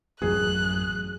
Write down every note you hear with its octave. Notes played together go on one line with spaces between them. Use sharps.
A1 F#2 F#3 G#4 F#6